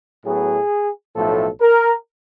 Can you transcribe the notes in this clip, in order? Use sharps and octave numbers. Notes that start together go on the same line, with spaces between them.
A2 F#3 B3 G#4
B1 A2 F3 A3 A4
A#4